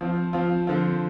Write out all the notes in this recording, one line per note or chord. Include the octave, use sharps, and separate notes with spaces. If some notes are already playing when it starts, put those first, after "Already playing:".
F3 C4 F4
F3 C4 F4
D3 F3 C4 F4